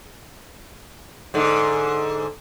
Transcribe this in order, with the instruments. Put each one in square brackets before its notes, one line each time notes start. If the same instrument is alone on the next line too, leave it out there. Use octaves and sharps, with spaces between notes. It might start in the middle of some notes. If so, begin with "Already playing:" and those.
[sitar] G#2 D3